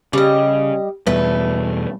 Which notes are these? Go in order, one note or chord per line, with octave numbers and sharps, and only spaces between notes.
C#3 G3 D#5
E2 B2 G3 A3 B4